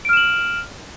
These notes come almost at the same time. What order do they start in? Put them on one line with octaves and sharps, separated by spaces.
D7 F6 E7 F#7